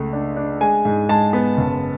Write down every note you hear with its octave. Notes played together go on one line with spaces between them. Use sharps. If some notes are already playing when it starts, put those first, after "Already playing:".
Already playing: C#2 A3
D4
D4
G#3 G#5
G#2
G#3 A5
B3
F#1